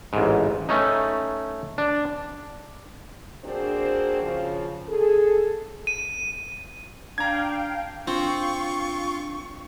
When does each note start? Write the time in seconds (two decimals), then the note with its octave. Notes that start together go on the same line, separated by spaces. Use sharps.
0.13 A1 G#2
0.69 A3 C#4 D#4
1.78 D4
3.44 A#3 C4 D4 F#4 G#4 C5
4.21 C#3 F3
4.89 G#4 A4
5.87 D#7
7.18 D4 F5 G5 A#5 G#6
8.07 C4 D4 F4 C#6